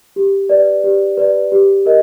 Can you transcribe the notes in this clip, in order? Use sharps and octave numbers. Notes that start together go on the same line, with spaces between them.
G4
B4 D5
G4
B4 D5
G4
A#4 D#5